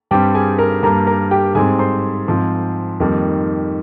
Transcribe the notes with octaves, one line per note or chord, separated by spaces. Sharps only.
G2 G3 C4 G4 G5
G#4 G#5
A#4 A#5
G2 G3 A#3 A#4 A#5
A#4 A#5
G4 G5
G#2 G3 C4 G#4 G#5
C5 C6
G#2 F3 C4
F2 D#3 G3 A#3